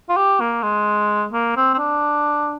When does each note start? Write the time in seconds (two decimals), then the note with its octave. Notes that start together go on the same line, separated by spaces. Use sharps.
0.09 F4
0.17 G4
0.41 A#3
0.63 G#3
1.33 A#3
1.56 C4
1.74 C4
1.79 D4